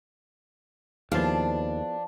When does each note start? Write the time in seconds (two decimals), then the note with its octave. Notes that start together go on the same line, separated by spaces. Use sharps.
1.12 D#2 F3 B3 D4 E4 G#4 F5